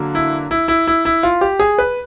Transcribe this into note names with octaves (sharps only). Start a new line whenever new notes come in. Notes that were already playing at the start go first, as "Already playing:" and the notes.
Already playing: D3 F#3 A#3
E4
E4
E4
E4
E4
F4
G4
G#4
B4